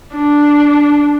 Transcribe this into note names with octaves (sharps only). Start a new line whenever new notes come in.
D4